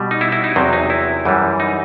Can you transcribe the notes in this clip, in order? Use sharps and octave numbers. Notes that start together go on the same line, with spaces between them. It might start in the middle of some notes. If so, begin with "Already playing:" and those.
Already playing: B2 G3
D#4
E4
E4
D#4
E2 C3 F#3 C4
D#4
E4
F#2 E3 G3
D#4